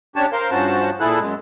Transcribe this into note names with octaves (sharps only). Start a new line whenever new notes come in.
C#3 D4 G4 C#5 A5
A#4 C5 F5 C6
G2 F3 C#4 F#4 C5 A5
A#2 E4 G#4 A4 F#6
F#2 G#3